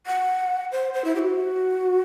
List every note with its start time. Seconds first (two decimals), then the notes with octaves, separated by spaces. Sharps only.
0.06 F#5
0.72 C5
0.94 C5
1.05 E4
1.15 G4
1.19 F#4